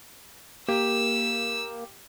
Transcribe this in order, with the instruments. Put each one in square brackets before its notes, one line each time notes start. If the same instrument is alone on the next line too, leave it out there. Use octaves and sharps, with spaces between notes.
[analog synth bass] A#3 [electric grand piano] G4 [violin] E6